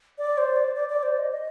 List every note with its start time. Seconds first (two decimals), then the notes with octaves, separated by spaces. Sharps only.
0.18 D5
0.38 C5
0.56 D5
0.76 D5
0.89 D5
1.03 C5
1.17 D#5
1.32 D#5